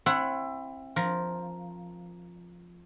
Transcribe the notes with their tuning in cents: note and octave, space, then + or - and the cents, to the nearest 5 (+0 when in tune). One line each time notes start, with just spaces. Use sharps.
C4 +30 E4 +20 F#5 -5
F3 +0 A#4 +0